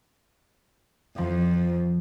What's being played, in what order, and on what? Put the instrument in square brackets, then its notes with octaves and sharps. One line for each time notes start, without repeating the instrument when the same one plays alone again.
[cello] F2 [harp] F3